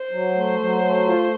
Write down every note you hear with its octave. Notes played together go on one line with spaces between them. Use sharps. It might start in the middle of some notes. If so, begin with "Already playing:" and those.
Already playing: C5
F#3
A3
F#3
A3
F4